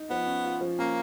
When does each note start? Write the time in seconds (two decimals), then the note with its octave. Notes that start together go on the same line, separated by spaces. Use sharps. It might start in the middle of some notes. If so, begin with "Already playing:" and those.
Already playing: D#4
0.10 F3 B3
0.26 C#4
0.44 F4
0.61 F3
0.79 A#3 C#4